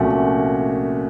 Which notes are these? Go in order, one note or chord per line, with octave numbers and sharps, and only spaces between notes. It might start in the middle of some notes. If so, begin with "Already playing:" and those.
Already playing: C2 A#2 F3 A3 C#4 F#4 F#5